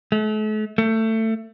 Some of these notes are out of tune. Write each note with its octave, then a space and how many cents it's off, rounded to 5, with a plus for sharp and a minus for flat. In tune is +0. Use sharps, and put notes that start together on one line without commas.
A3 -40
A3 +20